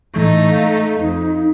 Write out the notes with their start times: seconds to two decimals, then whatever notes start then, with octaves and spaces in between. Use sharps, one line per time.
0.14 A2 E3 A3 D#4 C#6
0.52 F5
1.00 F2 D#4